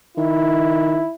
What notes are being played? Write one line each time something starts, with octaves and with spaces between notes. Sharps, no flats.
D#3 E4